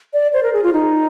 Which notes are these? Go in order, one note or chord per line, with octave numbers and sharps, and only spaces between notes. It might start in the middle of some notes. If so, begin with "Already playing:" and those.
D5
C5
A#4
G#4
F4
D#4